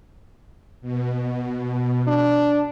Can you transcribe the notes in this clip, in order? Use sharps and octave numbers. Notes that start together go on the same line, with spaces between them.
B2
D4